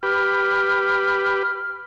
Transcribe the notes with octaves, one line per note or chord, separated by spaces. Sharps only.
G4 B4 F6